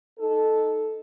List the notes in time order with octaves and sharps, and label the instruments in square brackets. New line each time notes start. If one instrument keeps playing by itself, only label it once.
[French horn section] D#4 A4